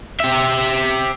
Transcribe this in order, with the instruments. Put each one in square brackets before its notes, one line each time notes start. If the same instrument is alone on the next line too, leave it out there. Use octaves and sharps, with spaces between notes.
[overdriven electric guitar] G4 E5